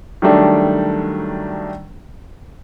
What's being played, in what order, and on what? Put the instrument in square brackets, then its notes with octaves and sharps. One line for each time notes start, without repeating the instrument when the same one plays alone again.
[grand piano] D#3 F#3 G3 A3 D4